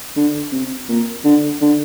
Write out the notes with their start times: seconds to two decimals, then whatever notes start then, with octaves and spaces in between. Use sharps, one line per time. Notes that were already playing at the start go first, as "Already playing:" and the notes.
0.17 D3
0.52 C3
0.89 A#2
1.25 D3
1.61 D3